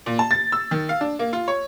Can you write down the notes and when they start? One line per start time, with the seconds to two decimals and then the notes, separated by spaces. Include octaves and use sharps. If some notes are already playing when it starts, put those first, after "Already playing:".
0.06 A#2
0.19 A5
0.31 A6
0.52 E6
0.71 D#3
0.89 F5
1.01 D4
1.19 A#3
1.33 F4
1.48 C#5